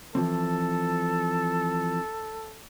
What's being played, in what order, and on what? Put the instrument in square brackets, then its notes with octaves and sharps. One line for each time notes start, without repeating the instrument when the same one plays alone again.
[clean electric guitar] E3 F3 C4 [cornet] A4